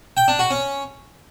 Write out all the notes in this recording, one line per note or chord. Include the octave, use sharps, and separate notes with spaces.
G5
D4
F#4
C#4